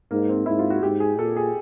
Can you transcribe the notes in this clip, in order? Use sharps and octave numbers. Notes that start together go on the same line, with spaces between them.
G#2 A#3
C4
G#2 E4
F4
F#4
G#2 G4
G#4
A#2 A4
G#4